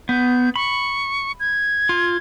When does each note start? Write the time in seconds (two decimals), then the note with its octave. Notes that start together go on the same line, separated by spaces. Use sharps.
0.09 B3 G6
0.56 B5 C#6
1.40 G#6
1.89 F4